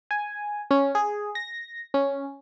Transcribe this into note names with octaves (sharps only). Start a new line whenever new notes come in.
G#5
C#4
G#4
A#6
C#4